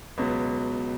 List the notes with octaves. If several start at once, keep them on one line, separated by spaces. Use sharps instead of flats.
C#2 B2 F#3